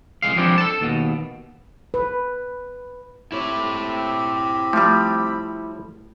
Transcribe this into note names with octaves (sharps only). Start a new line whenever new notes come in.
C2 A#2 G#3 F5
F3 G3 G#3 C4 D4
A4 A5
D#2 B2
B4
C4 E4 G4 C#5 B5
F3 G3 A3 C6